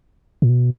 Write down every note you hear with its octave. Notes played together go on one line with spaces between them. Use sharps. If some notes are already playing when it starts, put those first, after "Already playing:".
A#2
B2